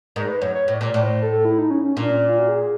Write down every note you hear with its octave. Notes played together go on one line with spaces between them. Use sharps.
G#2 A#4
B4
F#2 C#5
C#5
A2
D5
A#2
A2 C#5
C5
A4
A4
E4
D#4
C#4
C#4
A#2 D4
C#4
F4
F#4
G#4